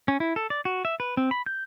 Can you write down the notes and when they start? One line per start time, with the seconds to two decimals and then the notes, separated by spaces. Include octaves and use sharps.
0.08 C#4
0.20 E4
0.36 A4
0.50 D5
0.65 F#4
0.85 E5
1.00 B4
1.17 C4
1.31 B5
1.46 G6